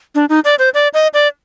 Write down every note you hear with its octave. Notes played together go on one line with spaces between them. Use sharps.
D4
D#4
D5
C5
D5
D#5
D5